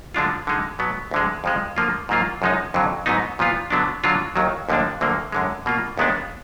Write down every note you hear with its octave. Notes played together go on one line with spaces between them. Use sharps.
D3 F3 G#3 D4 F4
D3 G#3 D#4
B2 F#3 B3
D2 D3 G#3
F2 F3 G#3
D3 F3 A#3 F4
G#2 F#3 A#3 F4
F#2 F3 G#3 D#4
F2 D3 F#3
G#2 F#3 B3 D#4
A#2 F3 B3 F4
D3 F#3 B3 D4
D3 F#3 D4 F4
D#2 D#3 F#3
D#2 D3 F3 A#3 D4
D2 D3 F#3 A#3
F#2 D3 G#3
B2 A#3 F4
D#2 D#3 G#3 B3 D4